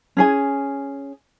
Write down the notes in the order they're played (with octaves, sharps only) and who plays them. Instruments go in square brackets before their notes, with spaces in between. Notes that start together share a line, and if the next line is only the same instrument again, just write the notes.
[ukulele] C#4 G#4 G#5